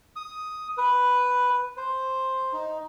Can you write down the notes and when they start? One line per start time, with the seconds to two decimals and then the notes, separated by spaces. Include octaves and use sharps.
0.16 D#6
0.78 B4
1.77 C5
2.53 D#4